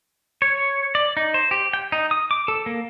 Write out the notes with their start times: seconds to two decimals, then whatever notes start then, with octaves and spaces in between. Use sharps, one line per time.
0.42 C#5
0.95 D5
1.17 D#4
1.34 C5
1.51 G4
1.73 G5
1.92 D#4
2.11 D#6
2.31 D6
2.48 A4
2.66 A#3